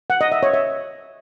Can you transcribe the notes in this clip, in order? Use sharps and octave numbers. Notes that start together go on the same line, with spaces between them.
F#5
D#5
E5
C#5
E5